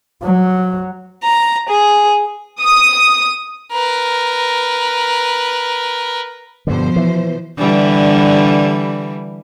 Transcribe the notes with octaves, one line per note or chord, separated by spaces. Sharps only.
F#3
A#5
G#4
D#6
A#4 B4
G2 B2 D3 F3 C5
E3
D3 E3 G3